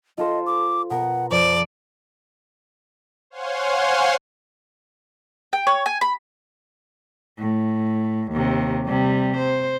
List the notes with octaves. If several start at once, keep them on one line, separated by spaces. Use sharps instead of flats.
F4 A4 C5 D#5
D6
B2 B3 A#4 F#5
F2 C5 D5 E6
C5 C#5 F5 F#5 G#5 C6
G5
C#5
G#5
B5
A2
D#2 C3
C3 G3
C5